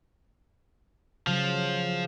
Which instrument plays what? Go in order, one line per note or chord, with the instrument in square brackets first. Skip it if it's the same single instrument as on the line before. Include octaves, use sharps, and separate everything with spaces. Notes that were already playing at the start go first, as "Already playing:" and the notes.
[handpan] C#3 F#3 [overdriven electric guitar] F3